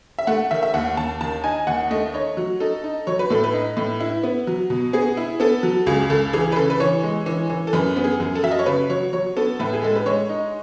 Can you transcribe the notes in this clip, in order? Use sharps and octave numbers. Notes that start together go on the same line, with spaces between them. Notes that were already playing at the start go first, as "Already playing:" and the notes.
E5
A3 F#5
D#3 E5
E5
D#2 F#5
D#2 A5
D#3 A5
D#4 G#5
D#2 F#5
A3 D#5
D#4 C#5
F#3
D#4 A4
D#4
F#3 C#5
B4
A2 A4
B4
D#4
A2
E4
B3
F#3
B2
B3 G#4
E4
B3 A4
F#3
C#2 G#4
C#2 A4
E3 G#4
B4
C#3 A4
B4
E3 C#5
G#3
E3
E3
A4
F#2 B4
B3
G#4
F#2
A4
F#3 E5
D#5
C#5
C#3 B4
F#3 C#5
F#3 C#5
B3 A4
A2 B4
G#4
G#3 A4
B4
G#3 C#5
D#4